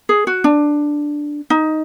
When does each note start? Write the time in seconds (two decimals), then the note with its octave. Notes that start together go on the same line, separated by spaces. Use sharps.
0.09 G#4
0.27 F#4
0.44 D4
1.50 D#4